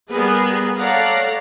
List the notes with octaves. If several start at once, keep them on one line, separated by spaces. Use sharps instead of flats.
G3 B3 G#4 A#4 B4
A4 C#5 D5 F5 F#5 A#5